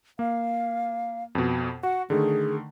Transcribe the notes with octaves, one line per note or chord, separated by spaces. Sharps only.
A#3 F5
F2 B2
F#4 F#5
D3 D#3 A3 G#4